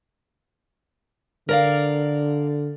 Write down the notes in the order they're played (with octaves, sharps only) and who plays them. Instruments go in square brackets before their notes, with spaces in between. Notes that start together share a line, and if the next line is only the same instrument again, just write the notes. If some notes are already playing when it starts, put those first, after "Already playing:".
[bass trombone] D3 [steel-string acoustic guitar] A#4 D5 F5